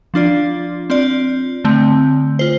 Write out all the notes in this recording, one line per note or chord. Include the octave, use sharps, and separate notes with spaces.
F3 D4 F4 D5
C4 F4 D5
D3 A3 C4
F4 C5